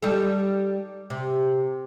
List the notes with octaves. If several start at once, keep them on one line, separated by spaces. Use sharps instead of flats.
G3 D#4 A4
C3